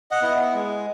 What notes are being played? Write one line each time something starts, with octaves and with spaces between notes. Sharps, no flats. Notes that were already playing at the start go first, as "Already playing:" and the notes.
D#5 F#5
B3 E4
G#3